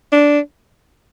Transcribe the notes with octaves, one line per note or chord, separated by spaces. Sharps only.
D4